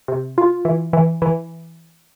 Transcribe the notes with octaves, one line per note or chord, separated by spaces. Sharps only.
C3
F4
E3
E3
E3